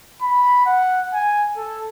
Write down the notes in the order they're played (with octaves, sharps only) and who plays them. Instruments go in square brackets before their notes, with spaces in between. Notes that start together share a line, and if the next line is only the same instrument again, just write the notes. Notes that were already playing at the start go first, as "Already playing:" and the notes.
[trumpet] B5
F#5
G#5
A4